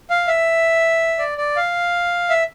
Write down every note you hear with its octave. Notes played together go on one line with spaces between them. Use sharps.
F5
E5
D5
D5
F5
E5